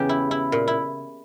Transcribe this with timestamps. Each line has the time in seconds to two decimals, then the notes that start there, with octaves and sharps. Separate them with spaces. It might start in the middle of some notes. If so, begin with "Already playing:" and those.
Already playing: E2 C#3 G4
0.09 E4
0.31 E4
0.52 A#2
0.67 E4